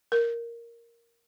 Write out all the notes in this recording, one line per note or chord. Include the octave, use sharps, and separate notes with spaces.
A#4